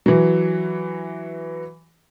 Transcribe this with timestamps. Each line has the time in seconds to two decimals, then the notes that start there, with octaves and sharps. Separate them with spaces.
0.06 E3 F#3